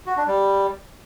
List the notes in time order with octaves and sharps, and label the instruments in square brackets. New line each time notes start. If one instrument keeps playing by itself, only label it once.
[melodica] F#4
D4
G3